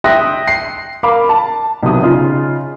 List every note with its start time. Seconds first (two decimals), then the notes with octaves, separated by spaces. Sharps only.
0.04 E5 G5 C6 D#6 F#6 A#6
0.48 C7
1.03 A#4 F5 B5 D6
1.29 A5
1.83 B1 C3 D#3 D#6
2.02 C#3 D#4 F4